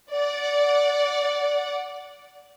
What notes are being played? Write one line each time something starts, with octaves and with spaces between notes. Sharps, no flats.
D5 F#5